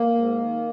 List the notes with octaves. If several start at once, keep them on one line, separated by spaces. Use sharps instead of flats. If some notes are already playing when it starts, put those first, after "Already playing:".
Already playing: A#3
G#2
D#3